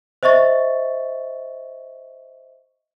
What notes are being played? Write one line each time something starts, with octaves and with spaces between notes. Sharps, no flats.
C5 D#5 E5 C#6 A6